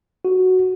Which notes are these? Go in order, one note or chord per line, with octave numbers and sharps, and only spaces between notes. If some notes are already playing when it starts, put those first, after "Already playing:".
F#4